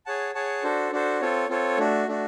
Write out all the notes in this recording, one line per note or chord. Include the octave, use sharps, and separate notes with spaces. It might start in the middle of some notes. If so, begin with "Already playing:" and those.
G#4 C#5 F#5 A5
G#4 C#5 F#5 A5
D4 F#4 A4 C5
D4 F#4 A4 C5
C4 F4 A4 C#5
C4 F4 A4 C#5
A3 D4 F#4
A3 D4 F#4